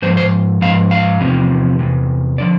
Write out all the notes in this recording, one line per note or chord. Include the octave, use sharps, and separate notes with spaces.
G#2 F3 C5
C5
G#2 F3 F5
F5
E2 C3 F3
E2 C3
D3 F3 D5